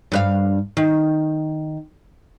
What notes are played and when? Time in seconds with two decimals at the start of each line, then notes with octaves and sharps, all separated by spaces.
0.12 G2 B4 F5
0.77 D#3